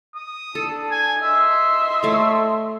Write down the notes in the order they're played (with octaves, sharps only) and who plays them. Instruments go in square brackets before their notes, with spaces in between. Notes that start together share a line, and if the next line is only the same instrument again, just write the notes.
[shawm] D#6
[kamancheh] D4 [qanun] A4
[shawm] G#5
[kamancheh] D#5 C6 [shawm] E5
[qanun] A3 C#5